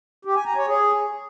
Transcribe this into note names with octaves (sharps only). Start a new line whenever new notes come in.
G4
G#5
A#5
C#5
G#4